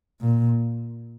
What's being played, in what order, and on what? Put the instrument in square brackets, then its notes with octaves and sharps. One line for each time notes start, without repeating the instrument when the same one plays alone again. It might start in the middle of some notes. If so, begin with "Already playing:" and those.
[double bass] A#2